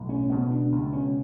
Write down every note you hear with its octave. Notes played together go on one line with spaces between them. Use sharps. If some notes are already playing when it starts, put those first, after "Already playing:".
Already playing: B1 A2
C#4
C#2 B2 B3
D4
C#2 B2
C#4